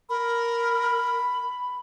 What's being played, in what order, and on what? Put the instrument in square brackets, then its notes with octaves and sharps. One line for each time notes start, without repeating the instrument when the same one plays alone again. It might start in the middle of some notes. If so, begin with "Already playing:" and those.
[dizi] A#4 [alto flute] B5